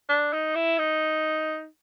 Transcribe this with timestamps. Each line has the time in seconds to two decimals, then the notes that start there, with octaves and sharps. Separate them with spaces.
0.09 D4
0.33 D#4
0.55 E4
0.79 D#4